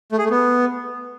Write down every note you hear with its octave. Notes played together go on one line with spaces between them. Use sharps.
A3
G#4
A3
B3